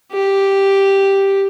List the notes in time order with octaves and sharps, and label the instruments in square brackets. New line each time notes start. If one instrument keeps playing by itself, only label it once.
[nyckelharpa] G4